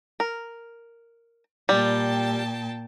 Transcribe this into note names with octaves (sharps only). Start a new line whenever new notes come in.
A#4
A#2 G3 G5 A5